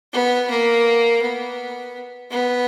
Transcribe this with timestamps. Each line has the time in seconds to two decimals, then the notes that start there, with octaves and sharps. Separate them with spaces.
0.13 B3
0.50 A#3
1.22 B3
2.31 B3